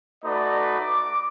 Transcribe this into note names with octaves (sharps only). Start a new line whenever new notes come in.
A3 D#4 F#4 B4 D5
D6